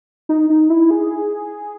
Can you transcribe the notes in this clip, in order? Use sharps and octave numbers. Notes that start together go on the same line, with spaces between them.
D#4
D#4
E4
G#4